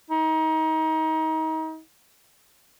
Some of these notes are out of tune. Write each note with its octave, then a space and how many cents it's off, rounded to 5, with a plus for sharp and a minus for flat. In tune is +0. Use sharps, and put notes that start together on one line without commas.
D#4 +30